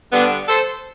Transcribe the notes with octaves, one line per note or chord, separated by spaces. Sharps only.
G2 D3 G3 B3 D4
A4 C5